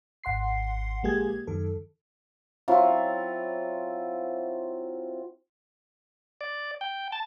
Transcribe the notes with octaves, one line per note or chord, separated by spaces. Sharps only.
G#1 F#5 C6 C7
A#1 G#3 A#3 G4 G#4 G#6
F#2 D#3 A4
F#3 C4 E4 F4
D5
G5
A5